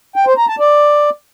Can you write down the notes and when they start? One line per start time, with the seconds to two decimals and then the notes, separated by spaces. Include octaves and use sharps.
0.16 G5
0.27 C5
0.38 A#5
0.49 A5
0.59 D5